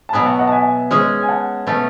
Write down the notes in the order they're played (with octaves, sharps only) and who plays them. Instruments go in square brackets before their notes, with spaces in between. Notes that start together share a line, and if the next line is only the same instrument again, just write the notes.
[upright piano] A5
[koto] B2 F#3 B3 [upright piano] G#5 B5
[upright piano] F#5 A5
D#5 F#5
A5
E5 G#5
[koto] G#3 C#4 G#4
[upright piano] G#5
F#5 A5
[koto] B2 A3 C#4